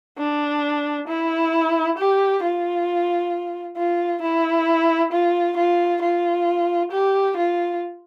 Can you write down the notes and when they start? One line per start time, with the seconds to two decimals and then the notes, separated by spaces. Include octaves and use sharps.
0.18 D4
1.08 E4
1.98 G4
2.43 F4
3.77 F4
4.22 E4
5.12 F4
5.57 F4
6.02 F4
6.91 G4
7.37 F4